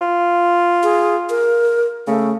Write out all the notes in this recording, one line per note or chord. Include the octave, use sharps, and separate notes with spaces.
F4
G#4
A#4
C#3 A3